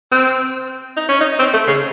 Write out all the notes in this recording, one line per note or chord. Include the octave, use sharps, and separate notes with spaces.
C4
D#4
C#4
D#4
C4
A3
C#3